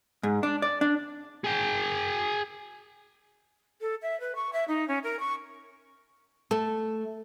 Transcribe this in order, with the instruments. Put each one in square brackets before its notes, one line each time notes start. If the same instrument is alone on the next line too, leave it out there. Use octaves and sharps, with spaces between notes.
[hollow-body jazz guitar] G#2
D4
D5
D4
[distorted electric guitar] G#4 G5
[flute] A4
E5
B4
C#6
E5
D#4
C#4
A#4
C#6
[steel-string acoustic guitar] A3 [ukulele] A4